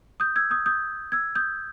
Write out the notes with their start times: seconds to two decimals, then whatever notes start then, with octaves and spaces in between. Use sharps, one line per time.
0.20 D#6 G6
0.36 E6 G#6
0.50 D#6 G6
0.66 D#6 G6
1.12 E6 G#6
1.35 D#6 G6